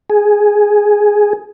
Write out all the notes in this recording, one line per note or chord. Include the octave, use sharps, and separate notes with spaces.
G#4